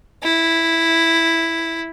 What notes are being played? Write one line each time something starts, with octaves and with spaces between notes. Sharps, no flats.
E4